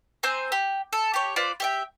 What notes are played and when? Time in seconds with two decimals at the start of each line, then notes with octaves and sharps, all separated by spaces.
0.23 C4 C5 G#5 A#5
0.52 G4
0.93 A4
1.14 G4 C#5
1.36 F4 B4 C5 D5
1.60 G4 E5 G5